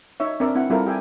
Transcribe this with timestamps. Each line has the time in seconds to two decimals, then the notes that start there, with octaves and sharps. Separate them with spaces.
0.20 D#4 C#5 E5
0.40 C4 D4 A#4 D5 E5
0.56 C4 E4 F#5
0.70 G3 C4 E4 F4 A4 A#4
0.87 G4 E5 G5 G#5